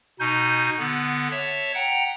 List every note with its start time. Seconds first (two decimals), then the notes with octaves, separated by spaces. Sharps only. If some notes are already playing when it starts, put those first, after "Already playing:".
0.20 B2 D#4 G#5 G6
0.79 D3 B3
1.31 C#5 E5 A5
1.74 F#5 G5 A#5